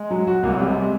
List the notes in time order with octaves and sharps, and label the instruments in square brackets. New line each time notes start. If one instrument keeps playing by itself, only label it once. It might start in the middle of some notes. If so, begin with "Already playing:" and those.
Already playing: [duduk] G#3
[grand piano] F#3
F#4
[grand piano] C2 [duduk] A#3
[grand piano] C3 [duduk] F#3
[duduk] G#3
G#3